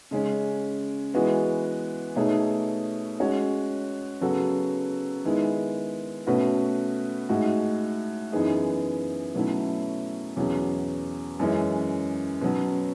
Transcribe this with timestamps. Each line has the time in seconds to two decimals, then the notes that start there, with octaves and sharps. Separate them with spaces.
0.11 C#3 G#3 C#4
1.14 E3 G#3 B3 F#4
2.16 B2 A3 D#4 G#4 C#5
3.20 G#3 C#4 F#4 C#5
4.21 C#3 F#3 B3 F#4 A4
5.24 D#3 G#3 B3 E4
6.27 B2 A3 C#4 F#4 B4
7.29 A2 G#3 D#4 F#4
8.32 F#2 E3 B3 D#4 G#4
9.35 B2 F#3 A3 C#4 E4
10.37 E2 B2 F#3 C#4
11.40 F#2 E3 G#3 C#4
12.41 B2 F#3 C#4